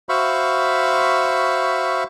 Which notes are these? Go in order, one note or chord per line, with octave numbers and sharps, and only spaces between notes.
F#4 C5 E5 F5 B5 C#6